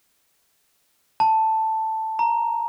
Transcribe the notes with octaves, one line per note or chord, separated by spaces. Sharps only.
A5
A#5